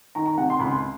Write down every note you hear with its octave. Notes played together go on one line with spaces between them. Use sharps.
D#3 A#5
A#5
C3 F#5
C6
C#2 B5
C6